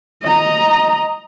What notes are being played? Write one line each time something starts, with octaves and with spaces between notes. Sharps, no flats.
D#5 A#5